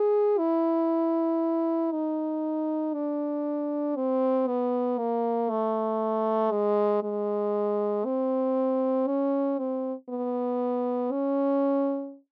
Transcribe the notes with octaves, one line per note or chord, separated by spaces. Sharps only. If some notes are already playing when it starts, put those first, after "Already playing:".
Already playing: G#4
E4
D#4
D4
C4
B3
A#3
A3
G#3
G#3
C4
C#4
C4
B3
C#4